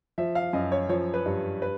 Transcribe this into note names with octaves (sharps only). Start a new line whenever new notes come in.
F3 E5
F5
F#2 D#5
C#5
F3 C#5
B4
G2
B4